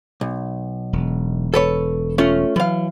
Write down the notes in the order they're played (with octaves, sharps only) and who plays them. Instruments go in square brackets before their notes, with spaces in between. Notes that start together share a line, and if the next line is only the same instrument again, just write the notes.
[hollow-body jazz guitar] B1
[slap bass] E1
[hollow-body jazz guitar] A4 B4 C#5
A3 C#4 F4
[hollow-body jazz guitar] E3 F5 [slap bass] F#3